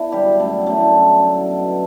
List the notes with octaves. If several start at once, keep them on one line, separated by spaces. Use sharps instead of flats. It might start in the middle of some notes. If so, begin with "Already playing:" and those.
Already playing: B3 D4 E4
D3 F#3 G3 G4
F#2 A3 A4
D3 F#3 A3 A4
F#2
D3 F#3
B2